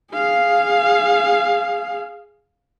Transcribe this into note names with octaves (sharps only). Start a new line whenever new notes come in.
G#4 F5